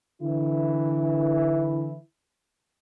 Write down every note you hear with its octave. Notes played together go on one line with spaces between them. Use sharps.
D3 E3 E4